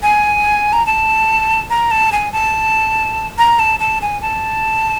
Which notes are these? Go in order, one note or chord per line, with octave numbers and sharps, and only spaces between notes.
G#5
A#5
A5
A#5
A5
G#5
A5
A#5
A5
A5
G#5
A5